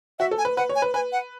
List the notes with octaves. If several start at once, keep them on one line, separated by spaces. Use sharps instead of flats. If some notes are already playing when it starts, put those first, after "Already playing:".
F#4 E5
A4
G#5
B4
B4 F#5
C#5
G#5
B4
B4 G#5
F#5